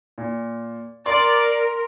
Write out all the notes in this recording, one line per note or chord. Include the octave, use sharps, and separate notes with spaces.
A#2
A#4 D5 C6